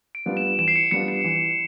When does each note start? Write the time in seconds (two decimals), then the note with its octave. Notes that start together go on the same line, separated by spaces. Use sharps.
0.15 D7
0.26 G3 B3 D4 F4
0.37 E7
0.59 E3 E7
0.68 C7
0.76 C#7
0.91 G3 B3 D4 F4 C#7
1.08 C#7
1.24 E3